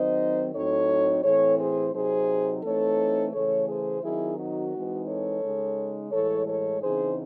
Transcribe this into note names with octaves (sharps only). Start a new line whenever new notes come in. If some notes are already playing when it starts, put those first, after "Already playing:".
Already playing: D#3 F#3 C4 D#4 C5 D#5
A2 F#3 C4 D#4 A4 C#5
A2 E3 C4 A4 C#5
G#4 C5
C3 F#3 C4 D#4 G#4 C5
E3 A3 C4 D#4 A4 C#5
C#3 E3 A3 A4 C#5
G#4 C5
D#3 F#3 C4 D#4 E4 G#4
D#4 F#4
E3 G#3 C4 D#4
A4 C#5
C#3 G#3 D#4
A2 E3 G#3 A4 C#5
A4 C#5
C#3 E3 C4 D#4 G#4 C5